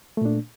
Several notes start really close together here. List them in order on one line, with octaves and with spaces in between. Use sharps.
A3 A#2 D4